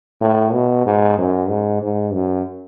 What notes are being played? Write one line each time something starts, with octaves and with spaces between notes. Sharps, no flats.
A2
B2
G#2
F#2
G#2
G#2
F#2